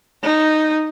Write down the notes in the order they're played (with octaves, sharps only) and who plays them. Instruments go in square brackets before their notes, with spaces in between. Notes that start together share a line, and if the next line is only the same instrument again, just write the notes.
[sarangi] D#4